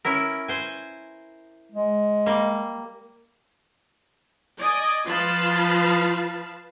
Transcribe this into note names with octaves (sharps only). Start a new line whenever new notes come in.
C#4 E4 A#4
C5 G#5
G#3
G3 A#3
D5 D#5 G#5
F3 F4 B4 F5 A5 B5